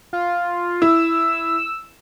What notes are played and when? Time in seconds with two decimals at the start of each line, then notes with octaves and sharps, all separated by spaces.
0.13 F4
0.82 E4 E6